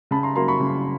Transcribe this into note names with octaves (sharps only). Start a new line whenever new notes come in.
C#3 A5 B5
A#5 C6
F#3 A#3 A#5 C6
B5 C#6
C#3